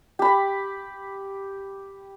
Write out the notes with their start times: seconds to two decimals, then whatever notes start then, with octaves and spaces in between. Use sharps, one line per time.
0.19 G4 B5